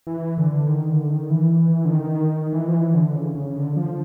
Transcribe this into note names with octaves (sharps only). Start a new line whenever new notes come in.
E3
D3
D#3
D3
D#3
E3
D3
D#3
E3
F3
E3
D3
C#3
C#3
D3
F3